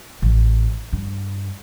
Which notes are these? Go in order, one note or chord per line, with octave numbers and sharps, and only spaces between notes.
A1
G2